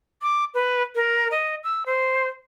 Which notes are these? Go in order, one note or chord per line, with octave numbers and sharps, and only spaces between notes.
D6
B4
A#4
D#5
E6
C5